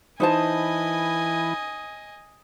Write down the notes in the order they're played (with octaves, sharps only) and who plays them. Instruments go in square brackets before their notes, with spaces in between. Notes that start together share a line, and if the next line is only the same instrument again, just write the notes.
[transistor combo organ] E3 E4 B4 [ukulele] D#4 C5 A5 [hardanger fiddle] D#5 G#5